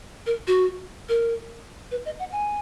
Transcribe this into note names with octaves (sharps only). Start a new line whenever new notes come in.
A#4
F#4
A#4
B4
D#5
F#5
G#5